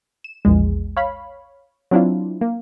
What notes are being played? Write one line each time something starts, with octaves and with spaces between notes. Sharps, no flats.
E7
A#1 E2 G#3
C#5 F5 B5
F#3 C4 D4 E4 F4
A#3